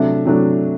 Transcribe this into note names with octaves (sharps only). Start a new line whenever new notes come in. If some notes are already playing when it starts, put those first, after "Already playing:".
Already playing: C3 F#3 A3 D4 E5
C3 F#3 A3 D4